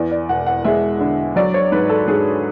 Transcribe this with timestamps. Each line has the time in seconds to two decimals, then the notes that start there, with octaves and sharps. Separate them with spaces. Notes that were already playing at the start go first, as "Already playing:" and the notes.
Already playing: E2 D5
0.11 D5
0.29 E1 F#5
0.47 F#5
0.64 G#3 E5
1.00 D3
1.36 F#3 D5
1.54 C#5
1.72 G#2 B4
1.89 A4
2.08 G#2 G#4